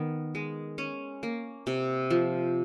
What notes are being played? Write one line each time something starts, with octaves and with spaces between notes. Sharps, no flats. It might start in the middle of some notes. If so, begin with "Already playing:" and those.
Already playing: D#3 B3
G#3
C#4
A#3
C3
F3